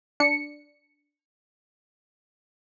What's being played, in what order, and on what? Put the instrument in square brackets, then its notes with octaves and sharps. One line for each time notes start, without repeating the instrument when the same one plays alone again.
[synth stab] D4 C#7